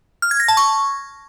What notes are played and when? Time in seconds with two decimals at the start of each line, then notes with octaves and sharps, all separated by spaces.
0.22 F6
0.31 G#6
0.40 A#6
0.48 A5
0.57 C#6